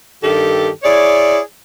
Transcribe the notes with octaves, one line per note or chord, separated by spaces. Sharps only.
G2 D#3 G4 A4
E4 G#4 C#5 D5